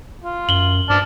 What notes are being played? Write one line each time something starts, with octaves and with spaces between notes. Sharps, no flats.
F4
F#2 F#7 G7
G2 D5 A5 F6